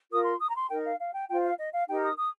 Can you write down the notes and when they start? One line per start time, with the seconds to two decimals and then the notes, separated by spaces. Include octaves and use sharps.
0.11 F4 A#4 D#6
0.25 C6
0.40 D#6
0.48 A#5
0.56 C6
0.69 D#4 A#4 G5
0.85 F5
0.99 F5
1.14 G5
1.29 F4 C5 G5
1.43 F5
1.58 D#5
1.73 F5
1.87 D#4 G4 A#4 G5
2.03 D#6
2.17 D#6